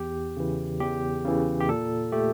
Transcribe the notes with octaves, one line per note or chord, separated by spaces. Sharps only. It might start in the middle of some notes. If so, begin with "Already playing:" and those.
Already playing: E2 G4
C#3 E3
E2 G4
C#3 E3
G4
A#2 A4
A3 G4